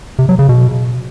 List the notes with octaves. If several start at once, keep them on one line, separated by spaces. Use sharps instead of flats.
C3
F#3
C#3
B2